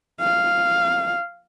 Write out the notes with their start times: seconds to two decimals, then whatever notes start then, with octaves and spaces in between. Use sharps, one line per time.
0.21 F5